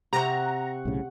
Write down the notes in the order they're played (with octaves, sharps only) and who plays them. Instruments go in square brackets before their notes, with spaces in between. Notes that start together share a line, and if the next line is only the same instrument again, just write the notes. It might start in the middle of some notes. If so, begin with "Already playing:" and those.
[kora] C3 C4 [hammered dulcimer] F#5 C#6 [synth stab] A#5
[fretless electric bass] B1 A2 C#3